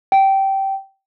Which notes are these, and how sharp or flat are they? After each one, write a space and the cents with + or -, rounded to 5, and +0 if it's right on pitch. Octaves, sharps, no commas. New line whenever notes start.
G5 -15